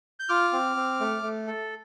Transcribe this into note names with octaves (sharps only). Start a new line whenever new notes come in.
G6
F4 D6 F6
C4
C4
A3
A3
A4